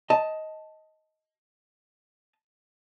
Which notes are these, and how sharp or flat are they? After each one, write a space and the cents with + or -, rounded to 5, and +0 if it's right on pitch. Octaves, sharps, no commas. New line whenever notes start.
D#5 +15 A5 +0